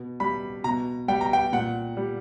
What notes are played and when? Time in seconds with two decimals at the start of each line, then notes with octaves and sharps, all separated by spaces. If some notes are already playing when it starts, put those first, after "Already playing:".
Already playing: B2
0.20 G3 B5
0.64 B2 A#5
1.08 G3 G5
1.21 A#5
1.33 G5
1.53 A#2 F#5
1.97 G3